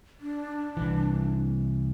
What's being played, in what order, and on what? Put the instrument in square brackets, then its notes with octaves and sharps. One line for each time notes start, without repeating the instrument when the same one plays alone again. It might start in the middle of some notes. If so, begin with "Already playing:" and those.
[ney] D4
[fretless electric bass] C2 E3